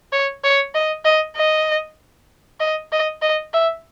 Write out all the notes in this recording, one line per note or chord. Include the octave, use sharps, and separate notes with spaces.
C#5
C#5
D#5
D#5
D#5
D#5
D#5
D#5
E5